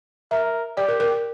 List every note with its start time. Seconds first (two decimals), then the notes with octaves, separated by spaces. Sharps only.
0.31 A#4 E5
0.77 G4 D5
0.89 A#4
1.00 A#4